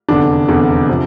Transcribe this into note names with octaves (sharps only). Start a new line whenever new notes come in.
F1 E2 D3 D4
F1 E2 D3
C3 F3